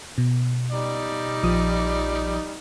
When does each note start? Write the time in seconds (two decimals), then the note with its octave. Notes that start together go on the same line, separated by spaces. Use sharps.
0.18 B2
0.71 G3 D#4 D5
1.43 A#1 F3 D#6